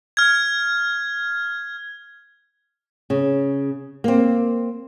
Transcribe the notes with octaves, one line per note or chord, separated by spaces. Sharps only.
F6 G#6
C#3
A#3 C4